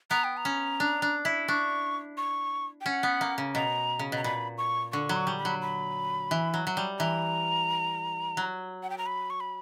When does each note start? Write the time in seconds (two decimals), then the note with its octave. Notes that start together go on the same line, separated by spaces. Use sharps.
0.10 B3 A#5
0.24 G5
0.37 A#5
0.45 C#4
0.80 D4
1.02 D4
1.25 E4
1.48 D4 C#6
2.17 C#6
2.81 G5
2.86 C#4 F#5
3.03 B3
3.21 A#3
3.38 C#3
3.55 B2 A#5
3.99 C#3
4.12 B2 A#5
4.24 A#2 B5
4.58 C#6
4.92 D3 C#6
5.09 F#3 B5
5.16 C#6
5.27 G3
5.39 B5
5.45 F#3
5.62 B5
6.31 E3
6.54 F#3
6.67 F#3
6.77 G3
6.99 E3 A#5
8.37 F#3
8.83 F#5
8.90 G5
8.98 A#5
9.06 B5
9.30 C#6
9.40 B5